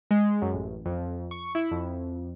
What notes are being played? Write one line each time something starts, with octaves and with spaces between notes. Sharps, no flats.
G#3
F#2
A1
F2
C#6
E4
F2